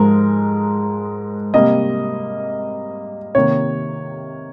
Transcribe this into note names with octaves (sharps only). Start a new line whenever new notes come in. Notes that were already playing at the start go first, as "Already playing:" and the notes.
Already playing: G#2 F3 G#3 A#4
C3 G3 A#3 D#5
C3 D#3 A#3 C#5